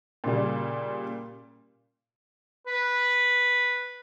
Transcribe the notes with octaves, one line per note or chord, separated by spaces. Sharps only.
A#2 C#3 G3
B4